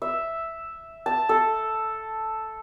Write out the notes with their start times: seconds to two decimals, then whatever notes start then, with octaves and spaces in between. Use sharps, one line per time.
0.02 E5
1.06 A5
1.29 A4